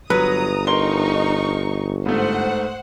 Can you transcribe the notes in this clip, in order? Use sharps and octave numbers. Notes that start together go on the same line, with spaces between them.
G1 F#3 B4 A#5 D#6
D#4 A#4 C6 C#6 G7
G#2 A3 C5 F#5